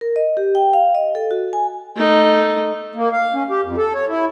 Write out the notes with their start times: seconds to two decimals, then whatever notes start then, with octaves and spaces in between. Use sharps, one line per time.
0.01 A#4
0.16 D#5
0.37 G4
0.55 G5
0.73 F5
0.95 D#5
1.15 A4
1.31 F#4
1.53 G#5
1.95 A3 D#4
2.95 A#3
3.13 F5
3.34 C#4
3.50 G4
3.64 F2
3.77 A4
3.95 C#5
4.08 E4